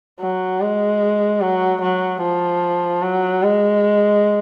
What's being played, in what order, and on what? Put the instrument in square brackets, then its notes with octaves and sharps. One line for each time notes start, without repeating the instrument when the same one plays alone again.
[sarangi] F#3
G#3
F#3
F#3
F3
F#3
G#3